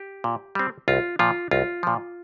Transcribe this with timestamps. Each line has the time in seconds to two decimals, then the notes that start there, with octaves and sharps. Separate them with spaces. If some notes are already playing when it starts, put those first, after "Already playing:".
Already playing: G4
0.24 A#2
0.55 G3 C4
0.88 C2 F4
1.19 A#2 F3 F4
1.51 C2 F4
1.83 A#2 F3